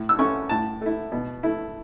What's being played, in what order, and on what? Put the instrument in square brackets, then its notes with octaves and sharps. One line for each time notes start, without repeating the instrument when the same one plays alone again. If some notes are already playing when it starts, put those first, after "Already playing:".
Already playing: [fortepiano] A2
E6
A3 C#4 E4 C#6
A2 A5
A3 E4
B2
A3 E4